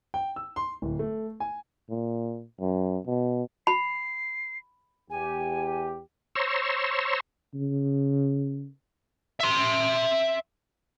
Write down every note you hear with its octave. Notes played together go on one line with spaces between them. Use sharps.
G5
E6
C6
D1
A3
G#5
A#2
F#2
B2
B5 C7
E2 G4 G#5
C5 C#5 A#5 C6 C#6 E6
C#3
E5 C6